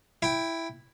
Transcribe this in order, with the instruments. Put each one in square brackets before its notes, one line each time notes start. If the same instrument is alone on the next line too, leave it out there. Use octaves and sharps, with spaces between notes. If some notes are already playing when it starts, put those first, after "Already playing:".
[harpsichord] E4 G5